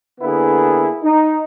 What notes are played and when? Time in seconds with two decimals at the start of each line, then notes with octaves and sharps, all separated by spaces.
0.21 D3 A#3 B3 E4 G#4
1.03 D#4